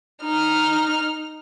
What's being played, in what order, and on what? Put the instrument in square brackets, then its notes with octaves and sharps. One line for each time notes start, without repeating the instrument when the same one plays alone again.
[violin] D#4 F6